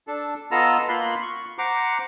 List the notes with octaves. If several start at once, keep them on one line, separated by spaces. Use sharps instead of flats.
D4 A4
B3 F4 A4 D#5 A#5 E6
A#3 F4 B5 C6 F#6
C#6
C5 F#5 A#5 D6